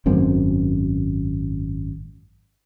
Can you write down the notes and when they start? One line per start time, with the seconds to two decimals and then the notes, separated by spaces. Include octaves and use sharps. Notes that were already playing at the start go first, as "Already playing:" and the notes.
0.06 G#1 F#2 A#3 C4